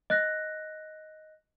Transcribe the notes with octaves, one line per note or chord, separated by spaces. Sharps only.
D#5 F#6 A#6